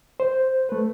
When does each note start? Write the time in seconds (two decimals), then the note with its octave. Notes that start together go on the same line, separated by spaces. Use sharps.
0.20 C5
0.69 A3 B4